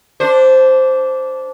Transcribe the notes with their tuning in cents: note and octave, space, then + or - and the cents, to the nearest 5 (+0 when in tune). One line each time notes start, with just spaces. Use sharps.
D4 -15 C5 +0